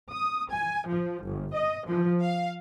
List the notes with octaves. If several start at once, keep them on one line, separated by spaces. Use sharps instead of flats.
D#6
G#5
F3
G1
D#5
F3
F5